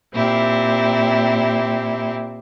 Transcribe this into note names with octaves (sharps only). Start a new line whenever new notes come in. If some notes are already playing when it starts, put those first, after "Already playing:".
A#2 C4 E4 G4